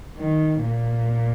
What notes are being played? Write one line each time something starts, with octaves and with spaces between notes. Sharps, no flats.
D#3
A#2